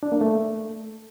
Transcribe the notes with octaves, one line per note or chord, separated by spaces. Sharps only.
D4
A#3
A3